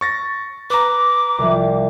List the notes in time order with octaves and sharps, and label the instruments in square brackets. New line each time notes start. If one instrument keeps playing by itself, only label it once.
[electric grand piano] C#6 A6 A#6
[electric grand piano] B4 A#5 [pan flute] D6
[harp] C2 F3